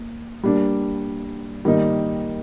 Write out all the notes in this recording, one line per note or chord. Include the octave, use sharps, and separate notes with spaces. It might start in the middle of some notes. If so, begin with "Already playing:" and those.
Already playing: A#3
G3 A#3 D4
D#3 G3 A#3 D#4